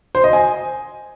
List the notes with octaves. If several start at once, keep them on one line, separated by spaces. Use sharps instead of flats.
C5
D#5
G#5